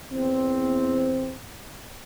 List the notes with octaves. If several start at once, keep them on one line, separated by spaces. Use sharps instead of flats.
E2 C4